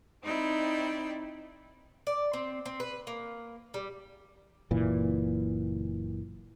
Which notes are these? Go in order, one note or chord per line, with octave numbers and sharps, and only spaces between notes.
C4 D#4 E4 D5 G5
D5
C4
C4
B4
A#3
G3
F#1 A#2 E3